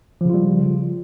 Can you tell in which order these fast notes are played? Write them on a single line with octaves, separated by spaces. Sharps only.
F3 C#3 F4 G3